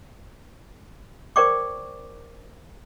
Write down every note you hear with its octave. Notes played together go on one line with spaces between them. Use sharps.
A#4 C5 D5 G5 C#6 D6